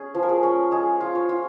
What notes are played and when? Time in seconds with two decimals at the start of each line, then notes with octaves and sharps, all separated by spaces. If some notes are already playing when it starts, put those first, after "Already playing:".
Already playing: C#4 G#4
0.15 F3
0.23 A#4
0.29 G#4
0.43 C#4
0.71 G#3 G#4
1.00 F4
1.15 C#5
1.29 F4